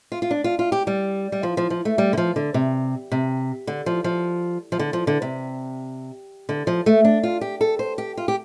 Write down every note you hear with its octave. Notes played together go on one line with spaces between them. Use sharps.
F4
F4
D4
F4
F4
G4
G3
G3
F3
F3
F3
A3
G3
D3
F3
D3
C3
C3
D3
F3
F3
F3
D3
F3
D3
C3
D3
F3
A3
D4
F4
G4
A4
C5
G4
F4
G4